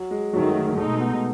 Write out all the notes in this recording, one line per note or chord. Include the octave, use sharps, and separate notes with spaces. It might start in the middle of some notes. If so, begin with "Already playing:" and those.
Already playing: F#3
G#3
F#2 D#3 F#3 A3
F#3
B2 G#3 A3 D#4
B3